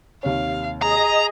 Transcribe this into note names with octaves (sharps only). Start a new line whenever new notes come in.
D#2 C3 C#5 F5
G#4 D#5 A#5